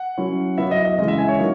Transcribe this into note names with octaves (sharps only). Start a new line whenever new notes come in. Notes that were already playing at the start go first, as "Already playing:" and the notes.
Already playing: F#5
F#3 C#4 E4
F#3 B3 E4 E5
D#5
D#5
C#3 E3 G#3 D#5
E5
G#5
C#5
F#3 A#3 D#4